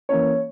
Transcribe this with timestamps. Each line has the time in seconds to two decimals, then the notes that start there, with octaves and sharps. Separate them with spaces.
0.09 E3 A#3 C#4 C#5